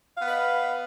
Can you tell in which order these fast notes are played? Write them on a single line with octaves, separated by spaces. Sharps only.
F5 B3 B4 D#5